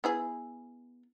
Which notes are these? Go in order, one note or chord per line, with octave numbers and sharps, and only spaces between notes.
B3 E4 G#4